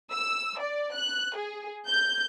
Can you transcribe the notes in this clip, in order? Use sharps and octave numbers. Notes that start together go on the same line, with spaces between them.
E6
D5
F#6
G#4
G6